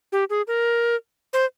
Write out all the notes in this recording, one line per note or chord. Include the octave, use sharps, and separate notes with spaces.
G4
G#4
A#4
C5